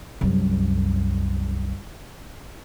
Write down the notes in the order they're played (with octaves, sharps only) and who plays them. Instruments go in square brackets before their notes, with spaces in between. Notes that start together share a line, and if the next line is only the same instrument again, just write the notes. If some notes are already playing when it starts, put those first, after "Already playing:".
[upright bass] C2 F#2